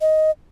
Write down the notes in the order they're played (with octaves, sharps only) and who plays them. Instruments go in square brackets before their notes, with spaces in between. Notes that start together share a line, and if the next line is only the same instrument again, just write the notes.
[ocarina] D#5